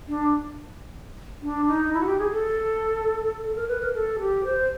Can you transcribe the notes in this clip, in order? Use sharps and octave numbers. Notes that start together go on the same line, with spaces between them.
D4
D4
D#4
E4
F#4
G4
G#4
A4
A4
A#4
B4
A#4
A4
G4
C5